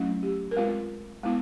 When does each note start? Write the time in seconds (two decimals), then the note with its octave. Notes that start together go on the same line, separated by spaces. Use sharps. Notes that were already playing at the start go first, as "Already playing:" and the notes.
Already playing: F#3 A3 C#4 E4
0.23 G4
0.51 A#4
0.56 G#3 C4 F4 B4
1.23 G#3 B3 E4